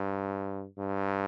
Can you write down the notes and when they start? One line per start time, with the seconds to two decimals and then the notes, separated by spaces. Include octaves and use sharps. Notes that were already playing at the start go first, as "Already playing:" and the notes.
Already playing: G2
0.78 G2